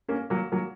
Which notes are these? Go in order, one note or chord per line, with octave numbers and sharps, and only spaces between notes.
A#3 C#4
F#3 A#3
F#3 A#3